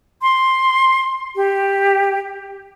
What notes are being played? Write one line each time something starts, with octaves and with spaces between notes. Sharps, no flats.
C6
G4